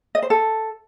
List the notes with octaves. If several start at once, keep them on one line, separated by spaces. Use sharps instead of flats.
D#5
C5
A4